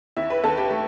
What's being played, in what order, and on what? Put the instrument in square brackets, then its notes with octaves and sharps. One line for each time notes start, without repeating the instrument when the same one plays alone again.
[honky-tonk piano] D#2 E4
B4
D#2 A4
G4
A3